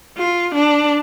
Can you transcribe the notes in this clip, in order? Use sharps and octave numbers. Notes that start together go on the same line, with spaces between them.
F4
D4